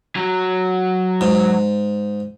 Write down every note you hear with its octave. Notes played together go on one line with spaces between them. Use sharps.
F#3
G#2